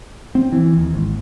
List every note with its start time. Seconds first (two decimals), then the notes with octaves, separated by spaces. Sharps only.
0.35 C4
0.52 E3
0.78 D#2
0.95 G#1